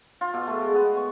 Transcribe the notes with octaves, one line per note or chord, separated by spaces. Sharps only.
F4
B2
A3
G#3
B3
C#6